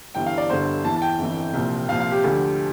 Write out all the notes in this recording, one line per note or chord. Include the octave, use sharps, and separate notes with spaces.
G1 G2 E3 G5
F5
D5
G1 G2 D3 C5
E2 E3 A5
A5
G5
G1 F2 E3
C2 A#2 F3
C2 A#2 F3 F5
F5
G4
D2 D3 F3